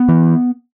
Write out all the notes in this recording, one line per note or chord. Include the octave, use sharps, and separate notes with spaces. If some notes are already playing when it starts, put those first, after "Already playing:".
Already playing: B3
E3